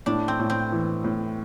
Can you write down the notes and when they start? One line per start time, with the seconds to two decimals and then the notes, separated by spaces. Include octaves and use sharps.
0.06 A2 D4
0.28 C4
0.39 A2
0.50 C4
0.72 E3
1.04 A2